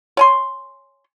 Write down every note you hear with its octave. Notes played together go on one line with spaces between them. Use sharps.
C#5 G#5 C6